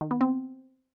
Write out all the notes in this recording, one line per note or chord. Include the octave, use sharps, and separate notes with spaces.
D#3
B3
C4